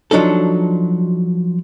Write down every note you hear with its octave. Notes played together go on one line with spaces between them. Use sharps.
F3 F#3 D4 D#4 A4